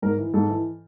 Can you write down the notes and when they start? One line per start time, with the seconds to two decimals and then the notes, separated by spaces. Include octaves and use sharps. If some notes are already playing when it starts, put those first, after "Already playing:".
0.02 G#2 A#4
0.18 E3
0.34 G#2 A4
0.49 E3